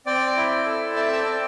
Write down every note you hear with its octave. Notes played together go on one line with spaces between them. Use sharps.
C4 D5 G5
E4
A4
C4 E5 A5
D5 G5
C4